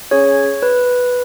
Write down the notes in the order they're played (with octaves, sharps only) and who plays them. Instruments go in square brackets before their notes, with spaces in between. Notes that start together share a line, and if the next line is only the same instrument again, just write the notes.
[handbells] C#4 G#4 C#5
B4